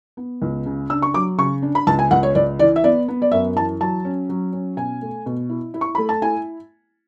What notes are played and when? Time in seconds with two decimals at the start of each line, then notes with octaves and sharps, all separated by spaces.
0.17 B3
0.42 C#2
0.66 C#3
0.90 D4 E6
1.02 C#6
1.14 F#3 D6
1.38 C#3 C#6
1.62 D4
1.75 B5
1.87 C#2 A5
1.99 G#5
2.11 C#2 F#5
2.23 C#5
2.35 C#2 D5
2.59 E3 D5
2.76 E5
2.84 B3 D5
3.08 B3
3.22 D5
3.32 F#2 E5
3.56 E3 A5
3.80 F#3 A5
4.05 C#4
4.29 F#3
4.52 C#4
4.77 B2 G#5
5.02 A3
5.26 B2
5.49 E4
5.74 E4
5.81 C#6
5.95 A3 B5
6.09 A5
6.22 E4 G#5